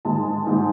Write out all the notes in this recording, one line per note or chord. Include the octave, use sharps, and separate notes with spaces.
G#2 D#3 G#3 A5
G#2 D#3 G#3